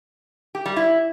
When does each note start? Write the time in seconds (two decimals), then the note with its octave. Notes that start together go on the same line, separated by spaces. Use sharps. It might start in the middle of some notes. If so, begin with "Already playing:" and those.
0.55 G4
0.66 G3
0.76 E4